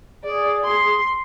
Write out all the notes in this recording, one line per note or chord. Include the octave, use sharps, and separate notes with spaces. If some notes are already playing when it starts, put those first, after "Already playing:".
G#4 D5
C6